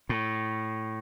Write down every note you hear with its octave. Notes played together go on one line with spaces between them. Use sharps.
A2